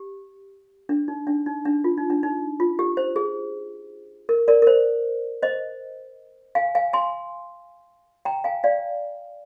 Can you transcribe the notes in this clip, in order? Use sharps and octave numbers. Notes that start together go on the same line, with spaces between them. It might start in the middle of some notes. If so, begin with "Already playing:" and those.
Already playing: G4
D4
D#4
D4
D#4
D4
F4
D#4
D4
D#4
F4
G4
C5
G#4
A#4
A#4 D5
A#4
C5
C5 D#5
F5 G#5
F5 G#5
G#5 C6
G5 A#5
F5 G#5
D5 F5